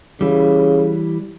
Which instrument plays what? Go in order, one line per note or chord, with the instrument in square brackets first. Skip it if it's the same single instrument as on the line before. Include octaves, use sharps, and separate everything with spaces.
[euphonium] C#3 [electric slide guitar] E3 G3